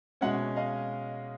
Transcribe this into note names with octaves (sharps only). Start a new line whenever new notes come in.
B2 G#3 C#4 E5 F#5
D#5 F5